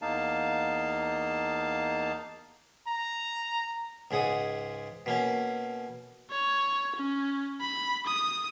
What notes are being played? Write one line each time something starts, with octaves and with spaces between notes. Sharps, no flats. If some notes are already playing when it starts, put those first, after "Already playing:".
E2 A#3 D#4 F5 A5
A#5
C#2 G#2 G#3 F#5 D#6
B2 A#3 C#4
C#5
C#4
B5
D#6